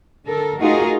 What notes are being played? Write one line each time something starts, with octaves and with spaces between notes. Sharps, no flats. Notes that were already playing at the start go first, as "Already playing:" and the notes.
D3 A4 A#4
A3 D#4 F4 F#4 G#4 A#4